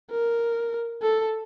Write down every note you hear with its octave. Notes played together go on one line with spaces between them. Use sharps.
A#4
A4